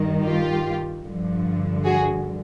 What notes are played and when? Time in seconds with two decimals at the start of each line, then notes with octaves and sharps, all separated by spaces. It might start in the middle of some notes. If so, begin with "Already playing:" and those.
Already playing: G2 D#3
0.22 F4 G4
1.04 G2 D3 F3
1.84 F#4 G#4